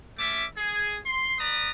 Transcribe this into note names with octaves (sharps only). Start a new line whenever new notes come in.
A3 C#4 E5 D6
G#4
C6
B4 D5 A#5 D#6